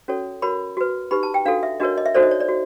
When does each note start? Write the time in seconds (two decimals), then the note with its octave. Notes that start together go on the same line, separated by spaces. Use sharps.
0.08 C#4 F#4 A4 C#5
0.42 F#4 A#4 C#5 B5
0.77 F#4 B4
1.11 D#4 G4 B4 B5
1.23 A5
1.34 G5
1.45 D4 F#4 A4 F5
1.63 E5
1.80 D4 F#4 A#4 C#5 D#5
1.98 D#5
2.06 E5
2.14 D#4 F#4 A4 C5 D5
2.23 D#5
2.31 C#5
2.40 D5
2.48 F#4